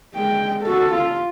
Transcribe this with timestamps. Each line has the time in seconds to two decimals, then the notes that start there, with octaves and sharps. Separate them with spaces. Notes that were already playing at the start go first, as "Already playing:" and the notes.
0.14 G#3 G5
0.62 F#4 A4
0.92 F4